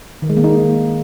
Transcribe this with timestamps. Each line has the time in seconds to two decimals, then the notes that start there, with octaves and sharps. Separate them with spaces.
0.22 D#3
0.30 G#3
0.37 A#3
0.44 D#4